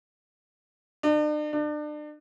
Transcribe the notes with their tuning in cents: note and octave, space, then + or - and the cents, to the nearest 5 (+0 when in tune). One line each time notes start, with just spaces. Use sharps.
D4 +45
D4 +35